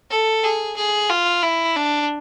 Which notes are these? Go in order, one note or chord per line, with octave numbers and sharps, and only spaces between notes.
A4
G#4
G#4
F4
E4
D4